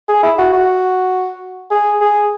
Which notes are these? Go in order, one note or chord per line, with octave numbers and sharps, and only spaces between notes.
G#4
E4
F#4
F#4
G#4
G#4